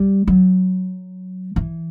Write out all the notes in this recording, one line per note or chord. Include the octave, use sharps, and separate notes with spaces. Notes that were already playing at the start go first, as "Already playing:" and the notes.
Already playing: G3
F#3
E3